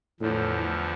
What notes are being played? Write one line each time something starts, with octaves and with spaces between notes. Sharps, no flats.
E2 A2 D3 F3